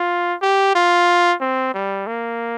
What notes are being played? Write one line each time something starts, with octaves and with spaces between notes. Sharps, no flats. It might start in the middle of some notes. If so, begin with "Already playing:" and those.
Already playing: F4
G4
F4
C4
G3
A#3